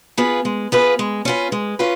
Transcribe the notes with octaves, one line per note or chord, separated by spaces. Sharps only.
B3 F4 G#4 B4
G#3
B3 F4 G#4 B4
G#3
C#4 F4 B4
G#3
C#4 F4 B4